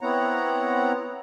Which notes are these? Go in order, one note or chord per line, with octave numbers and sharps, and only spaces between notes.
B3 C4 E4 C#5 F#5 A#5